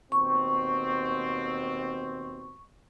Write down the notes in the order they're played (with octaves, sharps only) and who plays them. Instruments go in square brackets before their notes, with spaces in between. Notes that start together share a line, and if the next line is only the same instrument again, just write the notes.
[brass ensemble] D#2 B2 C4 [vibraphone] C#6